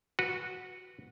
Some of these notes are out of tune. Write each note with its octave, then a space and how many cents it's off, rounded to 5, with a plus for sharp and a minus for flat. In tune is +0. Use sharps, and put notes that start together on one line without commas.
F#4 -10 B4 -20